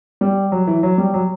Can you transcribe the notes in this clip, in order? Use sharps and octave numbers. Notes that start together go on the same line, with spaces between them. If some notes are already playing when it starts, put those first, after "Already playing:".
G3
F#3
E3
F#3
G3
F#3